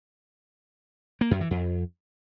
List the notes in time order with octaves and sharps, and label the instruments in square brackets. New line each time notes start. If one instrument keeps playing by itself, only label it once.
[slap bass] A#3
F#2
E3
F2